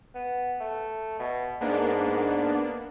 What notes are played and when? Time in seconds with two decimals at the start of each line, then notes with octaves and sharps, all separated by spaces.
0.15 B3
0.60 A3
1.19 B2
1.61 G#2 A#3 B3 D4